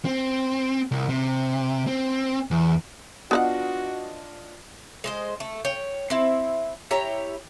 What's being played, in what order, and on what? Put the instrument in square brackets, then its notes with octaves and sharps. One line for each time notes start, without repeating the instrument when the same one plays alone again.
[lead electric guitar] C4
C2
C3
C4
E2
[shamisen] B3 B4 F#5 [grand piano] D4 F4 D#5 [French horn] F#4
[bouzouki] G#3 C5 D#5
A3
C#5 G5
C4 E4
E4 G4 C#5 A#5